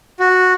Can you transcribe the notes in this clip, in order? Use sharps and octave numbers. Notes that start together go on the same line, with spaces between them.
F#4